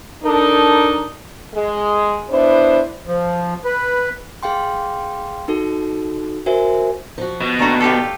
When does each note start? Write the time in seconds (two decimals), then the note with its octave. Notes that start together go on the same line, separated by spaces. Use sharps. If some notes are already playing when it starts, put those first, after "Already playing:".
0.24 D4 D#4 A4 A#4
1.54 G#3
2.30 B3 D4 E4 C5
3.07 F3
3.65 B4
4.43 G#4 F5 G5 C6
5.48 D#4 F#4 A4
6.46 F#4 A#4 C5 E5 G#5
7.18 F3 F#4
7.41 B2
7.59 D#2 A3 D4 F#4 A#5
7.80 F4 G4 A4